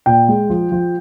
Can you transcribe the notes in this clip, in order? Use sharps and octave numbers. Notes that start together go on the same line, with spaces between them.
A#2 G5
G#3
F3
F3